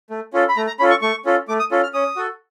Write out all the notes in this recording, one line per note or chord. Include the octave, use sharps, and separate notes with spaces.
A3
C#4 F4 A4
B5
A3 A#5
A#5
C#4 F4 A4 B5
C#6
A3 C#6
C#4 F4 A4
A3 D6
D#6
C#4 F4 A4
F6
C#4 D#6
F#4 A4